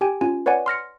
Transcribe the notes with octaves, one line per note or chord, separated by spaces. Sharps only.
G4 G5 G#5
C#4 F4 G#5
B4 C#5 D5 F#5 G#5
C6 F6 A#6 C#7